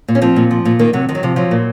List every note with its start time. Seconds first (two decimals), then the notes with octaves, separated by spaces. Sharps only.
0.08 A#2
0.15 C#4
0.22 F3 C4
0.36 A#2
0.51 F3
0.65 A#2
0.79 D#3 A#3
0.93 C3 F#3
1.09 D#3 F3
1.15 F#3
1.23 C3 F3
1.36 F3 F#3
1.51 A#2